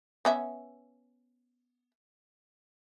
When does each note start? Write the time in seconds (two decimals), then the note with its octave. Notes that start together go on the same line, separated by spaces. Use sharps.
0.25 B3 C#4 E5